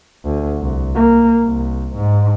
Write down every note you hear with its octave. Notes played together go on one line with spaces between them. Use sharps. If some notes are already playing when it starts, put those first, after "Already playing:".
D2
C2
A#3
C2
G#2